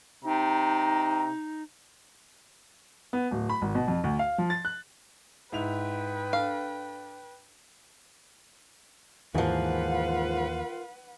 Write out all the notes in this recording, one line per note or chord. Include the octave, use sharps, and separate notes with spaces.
C3 D#4 A#5
B3
D1
B5
G#1
B2
F2
D2
F5
F3
A6
F#6
G#2 E4 B4 G5 F7
D4 A4 F5
D#2 G#2 E3 F3 F4 A#4 B4 F#5